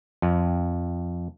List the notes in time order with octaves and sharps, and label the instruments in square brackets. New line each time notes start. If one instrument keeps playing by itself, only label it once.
[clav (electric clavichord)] F2